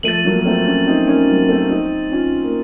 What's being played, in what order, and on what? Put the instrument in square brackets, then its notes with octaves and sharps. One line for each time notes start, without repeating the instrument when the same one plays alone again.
[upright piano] F3 A3 [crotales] A6 D#7 F#7
[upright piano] F#3 A#3
A#3
A3 C4
A#3 C#4
C4 D#4
A#3 C#4
F#3 A#3
A3 C4
C4 D#4
C#4 F4
A#3